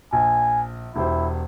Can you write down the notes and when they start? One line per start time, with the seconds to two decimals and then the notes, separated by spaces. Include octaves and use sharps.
0.13 A#1 G#5
0.96 E1 E4 G4 C5